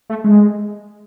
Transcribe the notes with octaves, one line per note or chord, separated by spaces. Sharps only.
A3
G#3